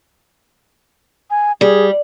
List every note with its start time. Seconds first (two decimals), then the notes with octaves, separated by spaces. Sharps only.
1.30 G#5
1.61 G3 G#4